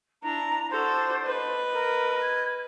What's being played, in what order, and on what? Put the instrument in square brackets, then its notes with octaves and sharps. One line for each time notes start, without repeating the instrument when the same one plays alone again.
[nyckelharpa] D4 E4 [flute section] A#5
[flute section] D4 C5 [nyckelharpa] F#4 A4
[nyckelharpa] B4 D#5
[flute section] A#4
G#6